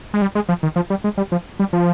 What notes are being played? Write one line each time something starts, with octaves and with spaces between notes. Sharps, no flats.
G#3
G3
G#3
F3
D#3
F3
G3
G#3
G3
F3
G3
F3